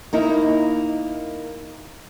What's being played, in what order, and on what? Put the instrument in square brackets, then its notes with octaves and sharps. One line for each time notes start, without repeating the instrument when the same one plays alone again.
[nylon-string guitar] A#3 D#4 E4 A#4